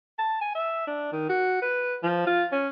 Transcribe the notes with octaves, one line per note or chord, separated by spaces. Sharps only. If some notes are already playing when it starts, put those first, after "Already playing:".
A5
G#5
E5
D4
D#3
F#4
B4
F3
F4
C#4